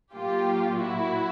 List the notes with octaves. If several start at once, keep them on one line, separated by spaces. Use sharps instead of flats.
A#2 F#3 A#3 F4 G4
E4 F#4